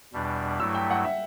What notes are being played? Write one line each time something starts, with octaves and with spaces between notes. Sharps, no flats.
E2 B2 G3 D4
G2 F#3 A3 E4 E6
G5
F#5
E5